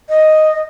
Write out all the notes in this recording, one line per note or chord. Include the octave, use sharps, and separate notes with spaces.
D#5